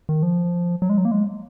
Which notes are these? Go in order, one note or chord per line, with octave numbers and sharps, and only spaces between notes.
D#3
F3
F#3
G#3
F#3
A#3
G#3